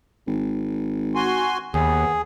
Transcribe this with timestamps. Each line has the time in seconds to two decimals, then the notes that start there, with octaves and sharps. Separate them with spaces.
0.27 G#1
1.15 F#4 G#5 C6
1.74 D#2 B3 G#4